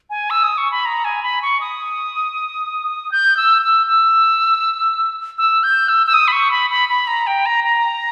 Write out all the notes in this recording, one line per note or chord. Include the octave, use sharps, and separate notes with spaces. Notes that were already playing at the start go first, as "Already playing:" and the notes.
G#5
E6
D#6
C#6
B5
A#5
G#5
B5
C#6
D#6
G6
E6
E6
E6
E6
G6
E6
E6
D#6
B5
C#6
B5
B5
B5
A#5
G5
A#5
A#5